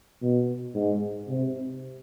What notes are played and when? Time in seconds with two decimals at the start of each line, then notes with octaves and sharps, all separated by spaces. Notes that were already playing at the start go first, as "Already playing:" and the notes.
0.22 B2
0.75 G#2
1.28 C3